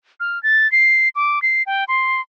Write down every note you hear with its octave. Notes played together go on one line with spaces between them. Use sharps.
F6
A6
C7
D6
C7
G5
C6